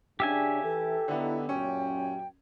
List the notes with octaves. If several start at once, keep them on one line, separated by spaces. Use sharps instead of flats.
C#3 D4 G4 E5 G#5
E3 A4
D3 B3 D#4 E4
F#2 A#2 F#3 C#4 G5